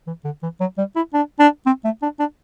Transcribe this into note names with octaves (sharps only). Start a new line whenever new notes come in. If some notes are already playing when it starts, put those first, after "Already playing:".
E3
D3
E3
F#3
G3
E4
D4
D4
C4
A3
D4
D4